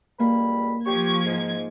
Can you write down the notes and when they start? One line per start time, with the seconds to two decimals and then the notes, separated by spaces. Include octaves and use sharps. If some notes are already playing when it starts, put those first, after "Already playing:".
0.20 C#2 G3 A#3 B5
0.86 F3 G4 C#6 G#6
1.26 G#2